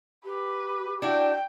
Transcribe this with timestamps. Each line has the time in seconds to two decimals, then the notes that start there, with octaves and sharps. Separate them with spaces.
0.25 G4 B4
1.02 D4 E4 F#4 G5